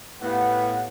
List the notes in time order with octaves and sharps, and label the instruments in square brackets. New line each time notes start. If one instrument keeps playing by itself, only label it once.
[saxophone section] A2 [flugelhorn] B3 [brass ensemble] G4 F5 F#5